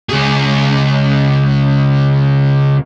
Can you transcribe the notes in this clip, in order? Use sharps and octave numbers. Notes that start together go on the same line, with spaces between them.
C#2 G#4